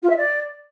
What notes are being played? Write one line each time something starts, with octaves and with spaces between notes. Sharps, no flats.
F4
E5
D5